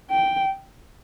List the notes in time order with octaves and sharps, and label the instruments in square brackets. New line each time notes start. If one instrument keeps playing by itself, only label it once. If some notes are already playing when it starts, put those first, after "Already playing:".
[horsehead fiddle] G5